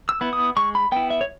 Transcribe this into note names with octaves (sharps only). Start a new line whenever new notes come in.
E6
B3 E4
D#6
G#3 C#6
B5
B3 E4 G5
E5
C#5